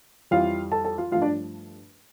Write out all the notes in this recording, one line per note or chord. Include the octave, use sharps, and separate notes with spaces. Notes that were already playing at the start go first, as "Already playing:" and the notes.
F2 E3 G3 F4 F5
A4 A5
A4 A5
F4 F5
G2 F3 A3 F4 F5
D4 D5